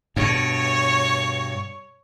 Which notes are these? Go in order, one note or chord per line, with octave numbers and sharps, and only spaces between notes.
G2 B2 C#5